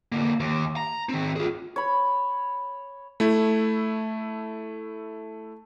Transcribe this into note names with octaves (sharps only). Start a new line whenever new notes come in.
D3 A#3
D#2
A#5
D#3 C4
F4 G#4
C#5 B5
A3 E4